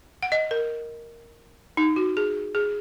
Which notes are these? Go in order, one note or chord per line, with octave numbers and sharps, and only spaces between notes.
F#5
D#5
A#4
D#4
F#4
G#4
G#4